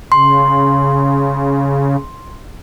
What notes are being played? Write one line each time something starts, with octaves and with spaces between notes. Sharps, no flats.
C#3 C6